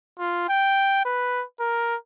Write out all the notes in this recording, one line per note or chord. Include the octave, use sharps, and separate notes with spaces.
F4
G5
B4
A#4